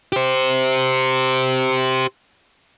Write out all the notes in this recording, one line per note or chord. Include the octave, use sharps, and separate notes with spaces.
G4 C5